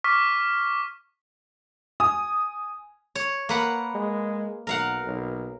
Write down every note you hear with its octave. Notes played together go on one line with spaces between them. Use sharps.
C#6 D6 F6 B6
G#5 D#6
C#5
A#3 B4 F#5
G#3
B1 A#4 F5 F#5
B1